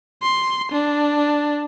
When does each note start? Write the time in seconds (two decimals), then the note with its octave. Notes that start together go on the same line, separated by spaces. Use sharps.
0.23 C6
0.72 D4